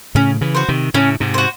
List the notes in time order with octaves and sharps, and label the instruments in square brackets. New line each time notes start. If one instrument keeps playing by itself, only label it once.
[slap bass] A2 C#3 [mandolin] C#4
[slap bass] C#3 E3
[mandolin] F#4 C5
[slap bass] C3 D#3
[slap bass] A2 C#3 [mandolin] C#4
[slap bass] G#2 C3
[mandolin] F#4 C5